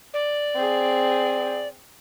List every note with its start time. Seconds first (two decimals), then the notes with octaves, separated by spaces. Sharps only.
0.14 D5
0.56 C4 G#4